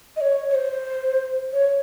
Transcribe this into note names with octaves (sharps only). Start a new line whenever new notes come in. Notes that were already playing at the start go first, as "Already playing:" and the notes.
D#5
C#5
C#5
C5
C#5